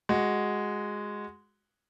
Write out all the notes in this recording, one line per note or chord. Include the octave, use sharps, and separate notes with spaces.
G#3 F#4